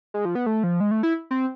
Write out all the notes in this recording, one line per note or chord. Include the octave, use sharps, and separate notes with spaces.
G#3
F3
B3
A3
F3
G#3
A3
E4
C4